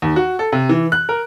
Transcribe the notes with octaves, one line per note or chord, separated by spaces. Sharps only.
D#2
F#4
A4
C3
E3
F#6
A#4